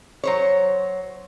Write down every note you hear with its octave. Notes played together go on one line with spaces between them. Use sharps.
F#3 C5 C#5